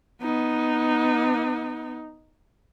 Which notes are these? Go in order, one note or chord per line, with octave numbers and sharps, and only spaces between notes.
B3 D#4